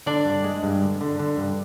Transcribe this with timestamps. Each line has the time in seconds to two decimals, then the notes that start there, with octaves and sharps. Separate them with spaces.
0.06 D3 D4 D5
0.26 G2
0.44 G#3
0.63 G2
0.82 D3
1.01 D3
1.20 D3
1.37 G2